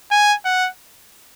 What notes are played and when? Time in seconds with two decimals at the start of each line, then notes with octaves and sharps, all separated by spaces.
0.11 G#5
0.45 F#5